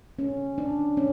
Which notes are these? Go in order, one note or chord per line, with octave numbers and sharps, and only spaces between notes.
C#4
D4
C#4